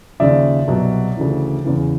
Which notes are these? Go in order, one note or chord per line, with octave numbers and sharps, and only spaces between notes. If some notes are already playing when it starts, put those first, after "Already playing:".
D#2 C#3 F3 D5 E5
C2 B2 F#3
D2 C#3 E3
E2 C#3 E3